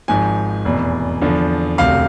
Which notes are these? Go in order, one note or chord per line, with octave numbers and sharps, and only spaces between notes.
G#1 G#2 F3 G#5
F1 E2 B2
E2 D3 F3
E1 D2 C3 F5